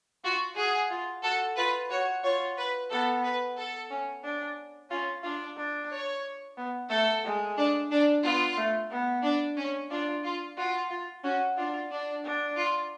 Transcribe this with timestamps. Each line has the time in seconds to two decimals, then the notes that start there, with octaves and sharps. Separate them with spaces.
0.24 F4 F#4
0.56 F#4 G#4
0.90 F4
1.23 F#4 A4
1.57 F4 B4
1.90 F#4 C#5
2.23 F4 C#5
2.57 B4
2.90 B3 A4
3.24 B4
3.57 A4
3.90 C#4
4.24 D4
4.91 C#4 F4
5.23 D4 F4
5.57 D4
5.91 C#5
6.57 B3
6.90 A3 A4
7.24 G#3
7.57 D4
7.91 D4
8.24 B3 F4
8.57 A3
8.91 B3
9.23 D4
9.57 C#4
9.90 D4 F4
10.24 F4
10.57 F4 F#4
10.91 F4
11.24 C#4 F#4
11.57 D4 F4
11.91 D4
12.24 D4
12.57 F4